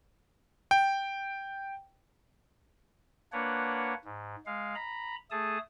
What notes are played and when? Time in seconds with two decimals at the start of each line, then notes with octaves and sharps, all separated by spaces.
0.71 G5
3.32 A#3 D4 B4 C#5 F#5
4.05 G#2
4.46 G#3 F5
4.75 A#5 B5
5.31 A3 G#4 A4 A5 D#6